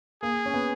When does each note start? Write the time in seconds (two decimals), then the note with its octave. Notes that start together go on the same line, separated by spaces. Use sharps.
0.23 A#3 G#4
0.46 C#4
0.54 B3